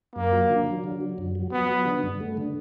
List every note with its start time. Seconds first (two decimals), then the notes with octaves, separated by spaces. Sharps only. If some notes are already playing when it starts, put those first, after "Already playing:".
0.15 F#2 A#3
0.33 F#3
0.50 D3
0.67 F#3
0.84 D3
1.01 F#3
1.18 F#2
1.35 F#3
1.52 F#3 B3
1.69 F#3
1.85 D3
2.03 G2
2.20 A3
2.37 D3